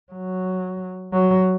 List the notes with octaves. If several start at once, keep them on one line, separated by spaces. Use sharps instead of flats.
F#3
F#3